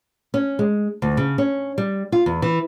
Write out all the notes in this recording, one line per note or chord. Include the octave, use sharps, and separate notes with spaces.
C#4
G#3
D2
C#3
C#4
G3
F4
E2
E3